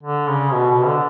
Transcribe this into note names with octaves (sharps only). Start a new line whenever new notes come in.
D3
C#3
B2
B2
D3